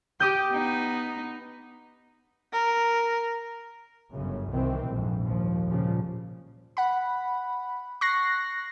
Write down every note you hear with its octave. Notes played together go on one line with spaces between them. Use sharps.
G4 D6 D#6 G6
B3 D#4
A#4
G1 F#2 C#3
C2 C3 D#3 E3 C4
A#1 F2 G#2
D#2 F3
A#2 C#3 F3 G3
F#5 B5
C#6 F#6 A#6 C7